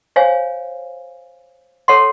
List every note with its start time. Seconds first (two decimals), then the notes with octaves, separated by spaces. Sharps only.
0.16 C5 C#5 F5 G#5
1.88 A4 C#5 F#5 C6